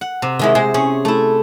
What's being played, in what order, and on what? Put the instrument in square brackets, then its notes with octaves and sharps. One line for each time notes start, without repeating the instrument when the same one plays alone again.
[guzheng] F#5
C3
[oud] D#3 G#3 E4
[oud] G#3 [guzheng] C5
[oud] C#4 [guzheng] G#4
[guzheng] A3 E4